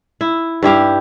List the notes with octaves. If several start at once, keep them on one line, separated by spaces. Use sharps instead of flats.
E4
G2 E4 G4 F5